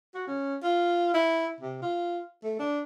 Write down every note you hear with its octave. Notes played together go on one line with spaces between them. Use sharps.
F#4
C#4
F4
E4
C3
F4
A3
D4